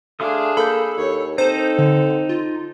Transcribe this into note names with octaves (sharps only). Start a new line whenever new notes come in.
A3 D4 G#4 F5 C6 D#6
A#3 A4 B5 G6
D#2 C#5
C4 D#4 A4 C5
D3
F4